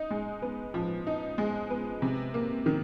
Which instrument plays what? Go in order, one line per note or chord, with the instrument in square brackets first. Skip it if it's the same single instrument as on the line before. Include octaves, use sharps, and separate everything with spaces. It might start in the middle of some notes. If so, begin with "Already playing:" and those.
Already playing: [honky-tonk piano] D#4
G#3
B3
F3
D#4
G#3
B3
C3
A#3
D#3